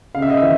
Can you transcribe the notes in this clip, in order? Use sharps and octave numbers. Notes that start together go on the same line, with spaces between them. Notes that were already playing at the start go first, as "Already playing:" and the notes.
C#3 F5
E5
D#5
E5
E3